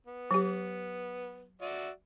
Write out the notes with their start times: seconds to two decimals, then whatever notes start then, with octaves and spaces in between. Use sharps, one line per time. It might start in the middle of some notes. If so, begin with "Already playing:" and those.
0.07 B3
0.31 F#3 G4
1.62 F#4 D5 E5